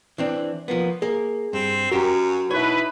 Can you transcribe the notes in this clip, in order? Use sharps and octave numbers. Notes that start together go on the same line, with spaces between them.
E3 C4 D4
F3 A#3 B3
A#3 G#4
G2 C4
F#2 F#4 G4 A#4
B2 D#4 E4 B4 C#5